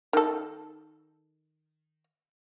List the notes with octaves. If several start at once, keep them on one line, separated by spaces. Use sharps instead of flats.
D#3 A4